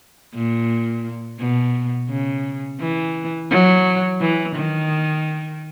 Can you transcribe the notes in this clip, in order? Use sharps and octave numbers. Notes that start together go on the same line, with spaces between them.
A#2
B2
C#3
E3
F#3
E3
D#3